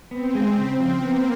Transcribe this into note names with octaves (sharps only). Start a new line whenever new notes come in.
B3 C4
G#3
C#3 C4
F3
A#3 B3